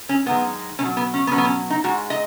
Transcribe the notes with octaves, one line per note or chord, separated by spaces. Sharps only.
C#4
F#2 D#3 G#3 B3
B2 F#3 C#4
B3
C#4
B3
B2 F#3 C#4
B3
C#4
D#4
G#2 G#3 F#4
D#5